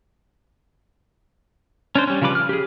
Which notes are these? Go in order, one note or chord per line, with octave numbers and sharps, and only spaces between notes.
C#4 D4 C5
G3 C#4
C#3 F3 G3 B4 D6
F6
G4 G#4